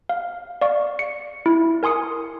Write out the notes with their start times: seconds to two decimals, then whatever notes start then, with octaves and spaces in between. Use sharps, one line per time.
0.09 F5
0.61 D5 F5 C#6
0.99 C#7
1.46 E4
1.83 A#4 G#5 C6 D#6 C#7